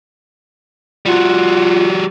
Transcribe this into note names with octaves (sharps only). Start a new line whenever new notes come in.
G3 F4 F#4